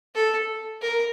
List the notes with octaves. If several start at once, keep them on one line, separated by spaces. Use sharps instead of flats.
A4
A#4